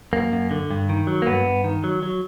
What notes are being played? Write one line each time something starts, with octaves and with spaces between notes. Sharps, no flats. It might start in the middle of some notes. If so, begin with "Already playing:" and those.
F#2 A#3
F#2
D3
G2
D#3
F#3
A#3
G2 B3
G2
D#3
F#3
F#3